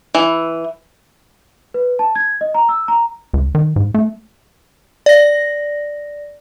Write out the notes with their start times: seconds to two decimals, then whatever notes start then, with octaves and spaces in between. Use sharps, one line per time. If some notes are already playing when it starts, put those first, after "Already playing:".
0.15 E3
1.74 B4
1.99 A5
2.15 G#6
2.41 D#5
2.54 A#5
2.69 E6
2.88 A#5
3.33 C#2
3.55 D#3
3.76 G#2
3.94 A3
5.06 D5 A#6